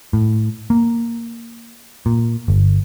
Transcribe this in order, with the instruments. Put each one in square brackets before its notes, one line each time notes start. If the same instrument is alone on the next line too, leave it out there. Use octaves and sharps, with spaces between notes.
[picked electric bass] A2
A#3
A#2
G1